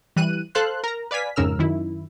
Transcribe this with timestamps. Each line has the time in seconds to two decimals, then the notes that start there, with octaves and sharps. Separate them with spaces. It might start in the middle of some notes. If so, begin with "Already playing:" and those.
0.16 E3 G3 F#6 D#7
0.55 A4 C5 F5 A5 C6 F#6
0.84 A#4 A#5
1.11 B4 D5 F5 G#5 B6
1.36 F2 G#2 C#3 A#4 E6 F6
1.59 F#2 D#3 E4